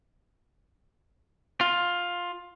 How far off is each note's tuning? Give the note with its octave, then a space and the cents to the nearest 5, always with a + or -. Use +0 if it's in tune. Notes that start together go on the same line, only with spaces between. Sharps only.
F4 +10